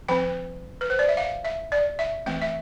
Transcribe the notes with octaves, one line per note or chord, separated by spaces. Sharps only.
F3 C4 G5
B4
C5
D5
E5
F5
E5
D5
E5
E3 A3 C4 G5
E5